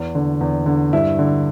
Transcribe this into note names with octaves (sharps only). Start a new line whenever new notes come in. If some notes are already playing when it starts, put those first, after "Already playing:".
Already playing: E2
D3
E2
D3
G2 E4
D3